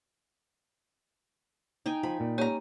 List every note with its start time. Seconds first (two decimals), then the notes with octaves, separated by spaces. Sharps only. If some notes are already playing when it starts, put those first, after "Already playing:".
1.86 D#4 G5 G#5
2.03 F3 B5
2.20 A#2
2.38 A#3 C#4 G4 A#5